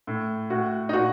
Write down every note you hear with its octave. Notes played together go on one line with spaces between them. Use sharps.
A2
A2 F#4
D#4
A#2 F#4